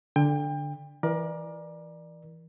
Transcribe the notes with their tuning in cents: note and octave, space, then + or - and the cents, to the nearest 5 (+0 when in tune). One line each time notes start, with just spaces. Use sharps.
D3 +0 G5 +30
E3 +0 A#4 +25 D5 +20